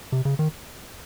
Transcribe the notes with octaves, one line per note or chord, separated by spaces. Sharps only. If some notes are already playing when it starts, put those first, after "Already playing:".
C3
C#3
D#3